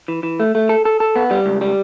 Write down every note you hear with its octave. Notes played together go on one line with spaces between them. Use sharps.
E3
E3
A3
A3
A4
A4
A4
B3
G3
C#2
G3